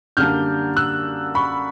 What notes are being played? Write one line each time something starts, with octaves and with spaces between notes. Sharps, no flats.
F#2 D3 G3 A#3 D4 F6 G6
E6 F#6
B5 C#6